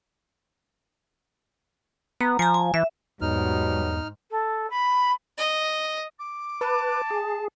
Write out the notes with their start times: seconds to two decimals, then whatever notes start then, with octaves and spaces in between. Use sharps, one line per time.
2.21 B3 A#5
2.39 F3 G#5 A#5
2.54 G#5
2.74 E3 E5
3.21 E2 G#2 B2 F#3 G3 D#4 F6
4.30 A4
4.70 B5
5.37 D#5
6.19 D6
6.61 B4 A5
7.10 G#4